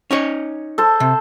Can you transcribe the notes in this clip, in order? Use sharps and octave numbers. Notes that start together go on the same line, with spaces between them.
C#4 D#4 C#5
A4 C5
C3